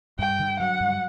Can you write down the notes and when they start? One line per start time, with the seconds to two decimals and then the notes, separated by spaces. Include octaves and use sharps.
0.19 G2 G5
0.39 D3
0.60 F#3 F#5
0.80 G2